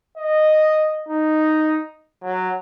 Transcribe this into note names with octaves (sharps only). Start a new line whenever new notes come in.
D#5
D#4
F#3